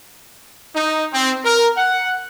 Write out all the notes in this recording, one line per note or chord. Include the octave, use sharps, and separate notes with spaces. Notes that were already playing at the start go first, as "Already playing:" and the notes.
D#4
C4
A#4
F#5